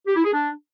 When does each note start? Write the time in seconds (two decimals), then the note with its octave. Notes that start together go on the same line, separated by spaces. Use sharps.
0.07 G4
0.16 E4
0.24 G#4
0.33 D4